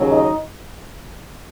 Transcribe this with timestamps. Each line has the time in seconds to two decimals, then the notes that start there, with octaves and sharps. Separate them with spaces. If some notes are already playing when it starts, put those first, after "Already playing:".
Already playing: D#2 C#3 F#3
0.10 D#4 D#5